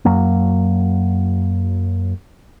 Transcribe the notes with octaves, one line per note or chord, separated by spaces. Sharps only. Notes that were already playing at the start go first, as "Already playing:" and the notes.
F#2 F#3 A#3